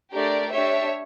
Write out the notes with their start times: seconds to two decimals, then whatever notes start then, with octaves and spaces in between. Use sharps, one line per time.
0.14 A3 D4 G4 A#4 D5
0.52 D4 G4 C#5 E5